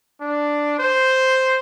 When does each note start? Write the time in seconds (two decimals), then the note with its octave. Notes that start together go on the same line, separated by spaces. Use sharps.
0.21 D4
0.79 C5